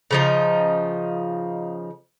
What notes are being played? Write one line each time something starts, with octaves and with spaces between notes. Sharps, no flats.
C#3 F3 D#4